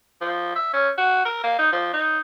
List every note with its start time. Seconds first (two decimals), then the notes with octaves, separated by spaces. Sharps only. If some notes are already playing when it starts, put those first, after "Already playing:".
0.21 F3
0.56 E5
0.74 C#4
0.98 F#4
1.25 A#4
1.44 A#3
1.59 D#4
1.72 F3
1.94 D#4